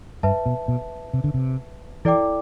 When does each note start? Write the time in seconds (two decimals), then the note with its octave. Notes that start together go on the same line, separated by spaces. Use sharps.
0.23 G2 B4 E5 A5
0.46 B2
0.68 B2
1.13 C3
1.24 D3
1.34 C3
2.05 E3 E4 A4 D5 G5 D6